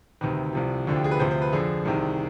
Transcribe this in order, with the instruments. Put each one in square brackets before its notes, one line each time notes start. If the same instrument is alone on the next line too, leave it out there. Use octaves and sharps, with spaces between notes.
[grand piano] D2 C3 D#3 B4
C2 C3 F3
D2 D3 F3
G4
G#4
B4
D2 C3 F3 C5
C5
B4
F2 D3 F3 G#4
C2 C3 D#3